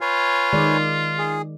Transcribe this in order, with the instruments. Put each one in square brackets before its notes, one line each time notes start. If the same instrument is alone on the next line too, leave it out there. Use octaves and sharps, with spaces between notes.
[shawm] F4 [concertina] B4 C#5 G#5
[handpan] D#3 G#3 D5
[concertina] G#4